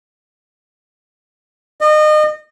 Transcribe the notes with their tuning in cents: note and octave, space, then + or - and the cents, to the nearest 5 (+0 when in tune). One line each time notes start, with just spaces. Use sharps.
D#5 -30